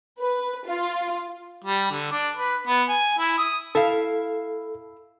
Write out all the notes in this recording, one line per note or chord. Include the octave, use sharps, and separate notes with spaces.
B4
F4
G3
D3
D4
B4
B3
G#5
E4
D#6
E4 A4 F5